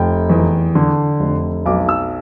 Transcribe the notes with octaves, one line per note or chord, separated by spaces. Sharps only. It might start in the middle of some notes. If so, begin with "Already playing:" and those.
Already playing: F1 G5
E2
D3
F1
B1 D6
E6